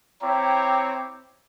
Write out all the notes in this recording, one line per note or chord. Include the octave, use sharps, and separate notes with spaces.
C4 E4 C#5 G5 A#5 D6